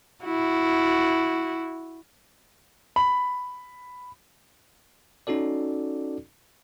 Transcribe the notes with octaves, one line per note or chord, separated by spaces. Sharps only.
E4 F#4
B5
C#4 D#4 F#4 A4 D5